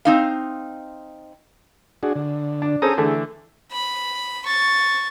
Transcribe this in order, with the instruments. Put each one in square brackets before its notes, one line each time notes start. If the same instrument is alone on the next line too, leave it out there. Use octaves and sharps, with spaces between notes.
[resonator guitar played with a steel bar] C4 D#4 F5
[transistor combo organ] D4 F#4 G#4
D3
[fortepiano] D4
[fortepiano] C#4 A4 C5 [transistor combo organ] G#4 A#5 D#6
[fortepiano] D3 E3 A3 [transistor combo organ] G#4
[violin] B5
C#6 A6